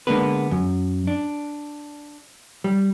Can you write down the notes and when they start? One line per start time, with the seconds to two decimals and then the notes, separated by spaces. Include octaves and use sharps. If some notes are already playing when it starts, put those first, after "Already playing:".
0.07 D3 G#3 A#3 B3 B4
0.51 F#2
1.07 D4
2.64 G3